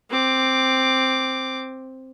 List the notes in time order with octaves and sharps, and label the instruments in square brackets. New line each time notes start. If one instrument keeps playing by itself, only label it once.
[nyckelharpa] C4 D6